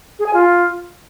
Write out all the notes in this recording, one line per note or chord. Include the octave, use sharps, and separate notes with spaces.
G#4
G#5
F4